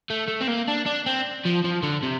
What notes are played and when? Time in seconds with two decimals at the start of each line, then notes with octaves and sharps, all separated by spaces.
0.10 A3
0.28 A3
0.41 C4
0.48 A#3
0.68 D4
0.86 D4
1.06 C4
1.45 F3
1.64 F3
1.83 D3
2.03 C3